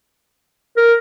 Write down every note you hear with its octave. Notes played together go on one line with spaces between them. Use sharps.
A#4